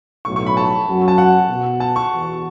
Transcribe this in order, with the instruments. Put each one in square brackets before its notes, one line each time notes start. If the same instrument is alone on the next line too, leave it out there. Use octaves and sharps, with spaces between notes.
[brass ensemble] B1 A2 F#3 A3 [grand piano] C#6
[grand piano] C#6
B5
A5
[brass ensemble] F#2 F#3 C#4 F#4
[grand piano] A5
F#5
[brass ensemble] B2 B3 F#4
[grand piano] A5
C#6
[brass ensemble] E2 E3 B3 F#4